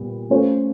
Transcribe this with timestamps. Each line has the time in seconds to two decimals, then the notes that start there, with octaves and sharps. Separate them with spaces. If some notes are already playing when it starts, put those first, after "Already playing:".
Already playing: A#2 G3 B3
0.30 A3 C#4 F4 A4 C5